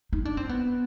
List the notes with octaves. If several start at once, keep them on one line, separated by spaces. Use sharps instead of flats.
D#4
D4
C4
B3